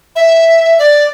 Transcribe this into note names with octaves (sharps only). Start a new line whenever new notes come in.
E5
D5